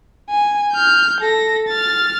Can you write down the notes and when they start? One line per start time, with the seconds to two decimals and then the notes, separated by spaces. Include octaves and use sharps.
0.30 G#5
0.73 F6 G6
1.20 A4 A#6
1.68 F6 A6